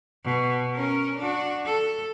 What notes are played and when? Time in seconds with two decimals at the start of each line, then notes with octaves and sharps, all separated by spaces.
0.25 B2
0.75 C#4 A#4
1.18 D4 F#4
1.65 A4